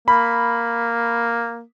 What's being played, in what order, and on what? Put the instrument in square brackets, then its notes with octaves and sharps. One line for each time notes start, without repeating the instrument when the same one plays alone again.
[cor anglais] A#3 [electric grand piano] B5